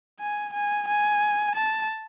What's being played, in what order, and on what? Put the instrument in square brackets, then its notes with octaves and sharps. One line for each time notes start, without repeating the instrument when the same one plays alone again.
[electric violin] G#5
G#5
G#5
A5